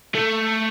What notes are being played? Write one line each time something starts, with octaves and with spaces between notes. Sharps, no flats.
A3